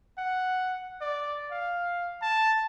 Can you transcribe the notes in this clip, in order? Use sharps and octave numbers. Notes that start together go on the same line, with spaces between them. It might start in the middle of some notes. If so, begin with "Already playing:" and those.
F#5
D5
F5
A5